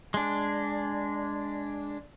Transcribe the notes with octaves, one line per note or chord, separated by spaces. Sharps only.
G#3 D4